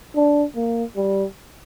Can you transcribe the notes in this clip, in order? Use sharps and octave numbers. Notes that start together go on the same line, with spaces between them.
D4
A#3
G3